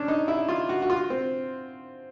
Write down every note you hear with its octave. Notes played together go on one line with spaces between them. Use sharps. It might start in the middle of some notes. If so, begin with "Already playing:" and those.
Already playing: C#4 D4
D#4
E4
F4
F#4
F#4
F4
C4